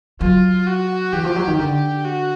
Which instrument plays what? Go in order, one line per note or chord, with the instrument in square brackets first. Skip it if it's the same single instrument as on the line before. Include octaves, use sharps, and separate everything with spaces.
[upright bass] F#3 [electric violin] F4
[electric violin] F#4
[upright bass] E3 [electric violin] G4
[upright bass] F3
F#3
D#3
[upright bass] D3 [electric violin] G4
[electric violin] F#4